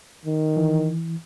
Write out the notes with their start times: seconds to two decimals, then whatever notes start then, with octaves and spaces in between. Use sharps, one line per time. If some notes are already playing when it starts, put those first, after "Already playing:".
0.25 D#3
0.57 E3